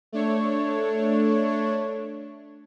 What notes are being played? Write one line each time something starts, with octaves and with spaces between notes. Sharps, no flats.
A3 D4 C#5